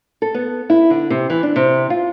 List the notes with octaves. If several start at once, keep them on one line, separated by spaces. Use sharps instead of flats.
A4
B3
E4
D3
C3
E3
D4
C3
F4